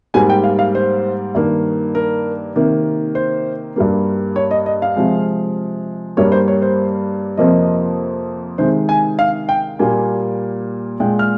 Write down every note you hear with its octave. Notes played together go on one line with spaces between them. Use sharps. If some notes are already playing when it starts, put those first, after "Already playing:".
G#2 G3 A#3 G#5
G5
F5
F5
C5
G2 D#3 A#3
A#4
C3 D#3 A#3
C5
G2 G3 A#3
C#5
D#5
D#5
F5
C3 F3 G#3
G2 G3 A#3 C#5
C5
C#5
C5
F2 C3 F3 A#3 D#5
C3 D#3 G#3 C5
G#5
F5
G5
A#2 G3 A#3 G#5
A#2 G#3 G5
F6